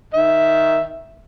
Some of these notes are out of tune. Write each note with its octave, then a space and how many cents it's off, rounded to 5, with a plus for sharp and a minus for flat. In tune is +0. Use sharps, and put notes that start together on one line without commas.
D#3 +5 E5 +0